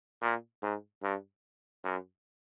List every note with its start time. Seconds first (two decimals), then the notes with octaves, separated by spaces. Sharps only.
0.22 A#2
0.62 G#2
1.03 G2
1.84 F#2